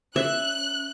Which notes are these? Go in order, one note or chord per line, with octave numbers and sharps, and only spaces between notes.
C#4 E5 F#6